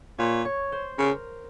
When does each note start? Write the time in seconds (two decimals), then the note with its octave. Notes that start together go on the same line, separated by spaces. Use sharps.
0.19 A#2 C#5
0.45 C#5
0.72 C5
0.98 C#3 A#4